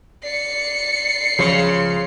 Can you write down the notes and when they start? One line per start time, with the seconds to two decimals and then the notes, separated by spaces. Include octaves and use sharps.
0.23 D5 C7 C#7
1.39 C#2 C#3 F3 C#5 C6